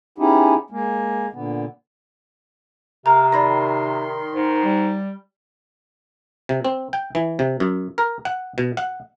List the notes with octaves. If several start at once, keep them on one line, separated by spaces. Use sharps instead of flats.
B3 C#4 D#4 E4 G4 G#4
G#3 A#3
A#2 D3 B3
C3 A#4 F5 A#5
D#3 D5 B5 C6 A#6
G#2
G3
C3
C4
G5
E3
C3
F#2
A#4
F#5
B2
F#5